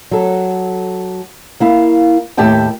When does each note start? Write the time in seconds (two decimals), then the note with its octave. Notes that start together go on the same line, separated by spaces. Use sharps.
0.11 F#3 A4
1.60 A#3 E4 F5
2.37 D#2 A2 G4 E5 G5 A5